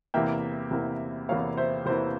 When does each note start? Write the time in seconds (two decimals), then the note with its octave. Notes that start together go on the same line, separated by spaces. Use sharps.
0.14 E2 C3 E3 A#3 E5 G5
0.71 E2 C3 E3 A#3
1.29 E2 C3 E3 A#3 C#5 F5
1.57 C5 E5
1.86 E2 C3 E3 A#3 C5